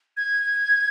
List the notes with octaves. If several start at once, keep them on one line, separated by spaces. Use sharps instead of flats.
G#6